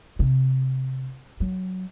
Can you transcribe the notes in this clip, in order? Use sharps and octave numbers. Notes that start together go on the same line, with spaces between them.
C3
F#3